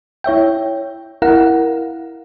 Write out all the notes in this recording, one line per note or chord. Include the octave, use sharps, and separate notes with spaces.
E4 C#5 E5 G5
E4 A#4 F5 F#5